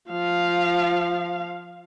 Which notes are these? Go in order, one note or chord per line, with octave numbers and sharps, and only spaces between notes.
F3 F5